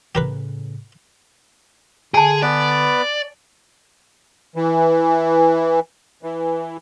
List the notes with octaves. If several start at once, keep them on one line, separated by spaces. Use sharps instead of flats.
A2 C#3 G4 A#4 B4
D3 G#4 G#5 A5
B3 B4 D5
E3
E3